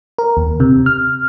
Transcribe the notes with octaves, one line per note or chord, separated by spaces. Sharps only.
A#4
D#2
C3
F6